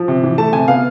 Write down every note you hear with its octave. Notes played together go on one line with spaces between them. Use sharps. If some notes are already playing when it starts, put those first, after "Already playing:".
Already playing: F3
C3
E3
A3 A5
C3 G#5
B3 F5